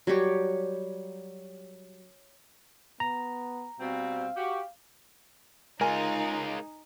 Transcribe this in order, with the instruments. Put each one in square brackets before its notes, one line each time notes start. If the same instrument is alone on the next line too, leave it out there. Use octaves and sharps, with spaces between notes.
[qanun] F#3 G3 G4 C#5
[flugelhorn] B3 [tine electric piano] A#5
[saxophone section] B2 G3 C4 [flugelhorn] F5
[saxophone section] F#4 G4
[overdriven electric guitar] G#3 F4 [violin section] D#4 [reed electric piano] A#4 [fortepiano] G#5